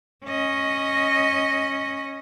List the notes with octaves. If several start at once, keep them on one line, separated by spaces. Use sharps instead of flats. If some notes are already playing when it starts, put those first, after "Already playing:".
C#4 D#5